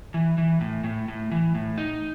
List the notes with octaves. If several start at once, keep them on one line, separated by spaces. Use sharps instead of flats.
E3
E3
A2
A2
A2
E3
A2
D#4